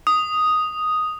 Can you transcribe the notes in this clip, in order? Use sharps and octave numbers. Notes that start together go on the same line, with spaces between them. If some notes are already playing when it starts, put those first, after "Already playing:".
D#6